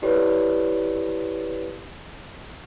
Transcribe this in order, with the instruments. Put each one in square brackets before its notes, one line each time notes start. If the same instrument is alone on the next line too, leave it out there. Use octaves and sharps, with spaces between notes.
[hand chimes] E4 G4 A4 B4 C#5 D5